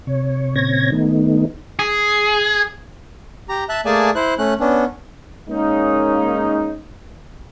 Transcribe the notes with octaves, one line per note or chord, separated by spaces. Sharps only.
C3 C#5
A#2 C#3 C4 C#5 G#6 A#6
D#3 A3 B3 D#4
G#4
G4 A#5
E5 A5 F#6
A3 A#3 G#4 D5 G#5 A5
E4 C5 F#6
A3 C#4 F#6
B3 C#4 D4
G#3 A#3 C#4 D#4